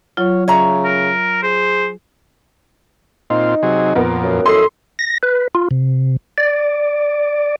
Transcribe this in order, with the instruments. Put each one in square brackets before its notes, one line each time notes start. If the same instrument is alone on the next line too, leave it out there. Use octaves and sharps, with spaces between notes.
[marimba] F#3 F4 [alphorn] C#5
[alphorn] C#3 [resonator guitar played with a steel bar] C#5 E5 A#5
[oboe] A#4
[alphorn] G#4 [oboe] C5
[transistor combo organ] A#2 C4 F4 [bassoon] D#4
[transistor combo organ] C3 F#3 G#4
[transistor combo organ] F2 A#2 [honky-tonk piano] B3 A#4
[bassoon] F#2
[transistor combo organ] E4 D#5 [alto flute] A4 [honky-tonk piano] C6 C7
[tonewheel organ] A#6
B4
F4
C3
D5